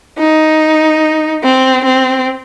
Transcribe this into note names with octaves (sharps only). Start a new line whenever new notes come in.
D#4
C4
C4